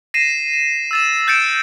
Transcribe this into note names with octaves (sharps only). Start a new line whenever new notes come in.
A#6 C7 D#7 E7
E7
E6 A6 E7
F6 G6 A6 C#7 D7 E7